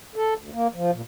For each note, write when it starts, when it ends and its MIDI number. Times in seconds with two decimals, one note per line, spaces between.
0.16 0.34 69
0.37 0.50 38
0.53 0.67 58
0.74 0.91 53
0.93 1.02 46